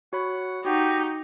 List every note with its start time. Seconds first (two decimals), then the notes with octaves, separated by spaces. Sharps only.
0.13 F#4 C#5 F#5 B5
0.65 D#4 F#4 G4 F#5